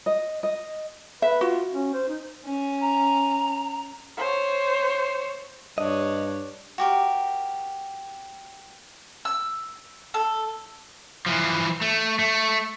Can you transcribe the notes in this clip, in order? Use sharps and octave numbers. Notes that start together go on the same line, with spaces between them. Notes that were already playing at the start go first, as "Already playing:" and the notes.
D#5
D#5
B4 E5
F4 F#4
C#4
C5
D#4
C#4
A#5
C5 C#5
G2 D4 C#5 D#5
F#4 G4 A#4
E6
A4
E3 F3
A3
A3